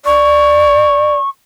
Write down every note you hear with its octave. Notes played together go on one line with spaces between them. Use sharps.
D5 C#6